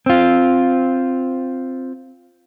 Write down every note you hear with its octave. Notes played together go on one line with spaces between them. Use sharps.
C4 F4